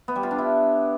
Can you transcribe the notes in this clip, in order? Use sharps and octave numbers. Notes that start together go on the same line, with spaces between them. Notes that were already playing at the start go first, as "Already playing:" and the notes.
B3
G3
F4
D4
E4